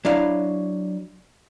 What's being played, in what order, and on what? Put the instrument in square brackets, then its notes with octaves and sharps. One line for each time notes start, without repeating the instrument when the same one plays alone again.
[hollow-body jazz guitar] F#3 D4 E4 F5